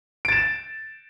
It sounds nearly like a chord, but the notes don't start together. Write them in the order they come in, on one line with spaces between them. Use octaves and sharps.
D7 A6 E7